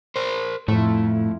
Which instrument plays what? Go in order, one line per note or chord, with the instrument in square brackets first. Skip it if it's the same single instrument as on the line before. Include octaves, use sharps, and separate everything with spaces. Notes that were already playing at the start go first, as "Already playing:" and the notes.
[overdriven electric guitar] A#4 C5
[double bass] F2 E4 [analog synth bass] A2 [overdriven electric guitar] A3